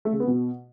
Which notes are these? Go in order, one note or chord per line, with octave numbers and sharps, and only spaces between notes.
A3
C#3
B3
B2